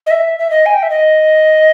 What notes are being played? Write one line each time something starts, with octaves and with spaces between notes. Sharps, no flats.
D#5
E5
E5
D#5
G#5
G5
E5
D#5